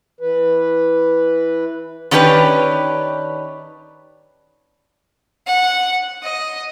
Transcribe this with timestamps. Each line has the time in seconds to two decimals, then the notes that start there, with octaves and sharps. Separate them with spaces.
0.21 E3 B4
2.11 D#3 C#4 D4 G4 G#4 B4
5.47 F#5
6.23 D#5